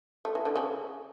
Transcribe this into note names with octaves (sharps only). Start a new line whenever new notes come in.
A3
E3
D3
C#3